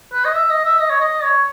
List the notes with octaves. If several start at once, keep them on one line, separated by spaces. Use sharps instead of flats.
B4
D#5
E5
D#5
E5
D#5
C#5
D#5
C#5